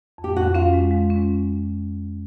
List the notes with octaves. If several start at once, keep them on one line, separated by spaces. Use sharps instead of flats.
F2
G4
F2 F#4
C#4 F4
G#3
G#3
C#4